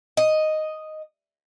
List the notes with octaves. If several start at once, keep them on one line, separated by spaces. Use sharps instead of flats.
D#5